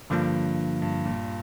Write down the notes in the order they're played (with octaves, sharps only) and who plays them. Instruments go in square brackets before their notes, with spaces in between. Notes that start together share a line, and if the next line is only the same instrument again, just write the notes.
[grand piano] G2 [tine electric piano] D3 F3 A#3 D4 F4
[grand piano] G2
A#2